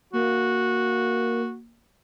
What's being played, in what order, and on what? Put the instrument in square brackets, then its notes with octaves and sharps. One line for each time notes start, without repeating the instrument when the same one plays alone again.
[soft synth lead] A#3 [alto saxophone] F#4